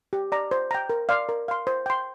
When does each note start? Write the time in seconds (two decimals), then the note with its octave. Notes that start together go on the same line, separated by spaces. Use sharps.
0.13 G4
0.32 D5 A#5
0.51 C5
0.71 G5 A#5
0.90 A#4
1.09 D5 F5 C6
1.29 A#4
1.48 F5 C6
1.67 C5
1.86 G5 C6